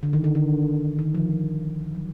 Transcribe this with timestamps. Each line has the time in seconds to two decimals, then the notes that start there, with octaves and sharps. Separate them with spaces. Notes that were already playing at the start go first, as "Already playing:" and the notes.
0.03 D3
0.13 D#3
0.24 D3
0.35 D3
0.99 D#3
1.15 F3
1.30 F3
1.95 F#3